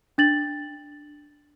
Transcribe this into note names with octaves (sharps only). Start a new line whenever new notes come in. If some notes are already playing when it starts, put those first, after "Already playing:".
D4 A6 F#7